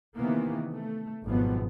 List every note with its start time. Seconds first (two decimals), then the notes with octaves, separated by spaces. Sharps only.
0.17 C3 D#3 E3 A#3 B3
0.72 A3
1.25 G#1 F#2 B2 F3 B3